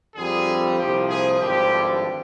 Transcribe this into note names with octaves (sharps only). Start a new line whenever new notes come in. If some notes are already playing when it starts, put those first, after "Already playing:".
F2 D3 G3 G#4
C2 A#2 F3 G4
G#4
G#1 G2 D3 F3 G4